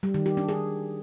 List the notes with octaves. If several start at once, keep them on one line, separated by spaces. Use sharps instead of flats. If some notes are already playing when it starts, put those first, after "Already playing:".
G3
D#3
G4
D4
G#4